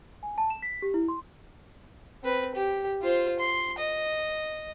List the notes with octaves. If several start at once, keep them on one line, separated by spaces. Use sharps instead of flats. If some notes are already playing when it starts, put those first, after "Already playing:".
G#5
A5
E7
B6
G4
E4
C6
C4 B4
G4
F4 C5
C6
D#5